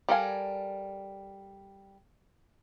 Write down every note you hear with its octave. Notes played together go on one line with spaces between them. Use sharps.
G3 A4 A#4 F5 G#5